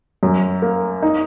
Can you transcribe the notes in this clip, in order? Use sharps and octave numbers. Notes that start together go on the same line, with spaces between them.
F#2
A#3
D#4